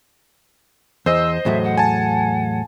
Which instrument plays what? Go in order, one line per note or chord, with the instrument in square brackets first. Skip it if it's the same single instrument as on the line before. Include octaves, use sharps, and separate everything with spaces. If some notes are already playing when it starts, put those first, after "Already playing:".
[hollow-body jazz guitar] E2 [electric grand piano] C5 D#5 [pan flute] E6
[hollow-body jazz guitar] E2 A2 F#3 [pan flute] E5
[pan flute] F#5
[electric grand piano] G#5 A5